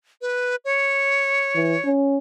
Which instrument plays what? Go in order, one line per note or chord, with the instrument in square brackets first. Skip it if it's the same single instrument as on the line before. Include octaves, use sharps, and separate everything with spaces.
[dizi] B4
C#5
[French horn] E3
C#4